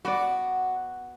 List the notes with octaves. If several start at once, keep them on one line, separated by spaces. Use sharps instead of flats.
B3 F#4 B4 D5